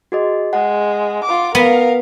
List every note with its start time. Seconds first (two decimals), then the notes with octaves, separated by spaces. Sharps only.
0.12 F#4 G#4 D#5
0.53 G#3 F#5
1.24 F4 D6
1.55 B3 A#4 F5